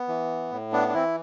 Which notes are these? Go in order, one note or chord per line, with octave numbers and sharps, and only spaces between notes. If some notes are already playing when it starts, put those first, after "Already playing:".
Already playing: B3
E3
A2
B3 D4
D4
E3 C4 E4